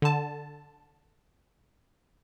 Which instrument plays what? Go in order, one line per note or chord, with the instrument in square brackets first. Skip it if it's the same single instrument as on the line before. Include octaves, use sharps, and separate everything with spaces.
[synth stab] D3 A5